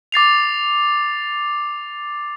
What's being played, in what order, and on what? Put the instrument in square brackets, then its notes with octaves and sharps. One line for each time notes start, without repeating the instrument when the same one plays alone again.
[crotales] D6 A6 C7 F7